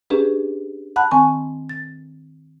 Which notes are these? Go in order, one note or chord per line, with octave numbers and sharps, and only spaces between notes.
C#4 D4 G4 G#4 B4
F#5 A5 B5 F#6
D#3 C4 G#5 C#6
A6